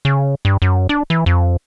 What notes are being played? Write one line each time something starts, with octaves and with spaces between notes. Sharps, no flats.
C#3
G2
F#2
D4
E3
F2